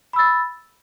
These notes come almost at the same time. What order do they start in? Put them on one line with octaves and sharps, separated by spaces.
B5 E6 A6